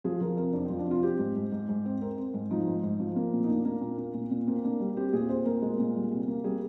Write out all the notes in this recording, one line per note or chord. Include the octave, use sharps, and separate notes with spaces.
F3 G#4
F3 A#4
C3 A#4
F2 D4
F3 C4
D4
C3 F4
C4 G4
G#2
G#2
G#2
G#2
C4
C4 A#4
C4
G#2
F3 D#4
G#2
G#2
F3
A#3
A#2
D#4
A#3 D4
A#3
A#2
A#3
A#2
A#2
A#3 C4
A#3 D4
G3
C4 G4
A#2 G#4
C4 C5
A#2 A#4
G#3
A#2
G3
C3
A#3
G3 G#4